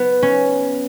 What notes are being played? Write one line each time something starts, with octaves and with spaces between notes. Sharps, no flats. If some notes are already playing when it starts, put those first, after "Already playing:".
Already playing: B3
C#4